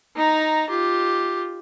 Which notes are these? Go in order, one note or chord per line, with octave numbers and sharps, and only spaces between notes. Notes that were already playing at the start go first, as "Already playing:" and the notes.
D#4 A#5
F4 G4